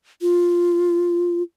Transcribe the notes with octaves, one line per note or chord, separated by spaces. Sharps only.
F4